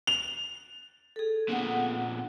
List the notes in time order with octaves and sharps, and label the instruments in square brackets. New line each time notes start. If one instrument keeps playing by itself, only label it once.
[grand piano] F7
[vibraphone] G#4 A4
[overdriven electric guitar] A#2 D3 [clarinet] B3 [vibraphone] G#4 F#5